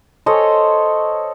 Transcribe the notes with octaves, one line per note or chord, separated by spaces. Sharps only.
A4 C5 C#5 D#5